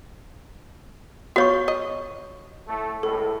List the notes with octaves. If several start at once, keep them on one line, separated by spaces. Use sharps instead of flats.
B3 F4 F#4 C#5 C#6
D#5
A2 A3
C#2 A2 A4